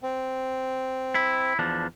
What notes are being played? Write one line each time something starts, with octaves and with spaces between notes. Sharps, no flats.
C4
E4
E2 F3 D4